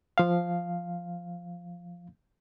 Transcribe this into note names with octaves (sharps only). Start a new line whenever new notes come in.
F3 F5